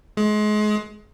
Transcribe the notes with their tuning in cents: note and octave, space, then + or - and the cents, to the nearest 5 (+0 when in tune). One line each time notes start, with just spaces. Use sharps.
G#3 +30